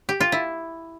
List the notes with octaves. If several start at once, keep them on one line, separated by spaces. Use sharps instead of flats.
G4
F4
E4